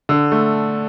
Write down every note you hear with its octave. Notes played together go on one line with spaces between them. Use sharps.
D3
A3